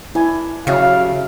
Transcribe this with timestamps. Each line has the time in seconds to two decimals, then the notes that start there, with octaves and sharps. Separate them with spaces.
0.15 D4 E4 G#5
0.67 C#3 F#3 G3 A3 F5